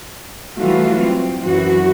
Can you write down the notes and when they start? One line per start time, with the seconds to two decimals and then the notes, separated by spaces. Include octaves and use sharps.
0.56 E3 F#3 G3 A3 F4 F#4
1.01 C4
1.43 F#2 E3 F#4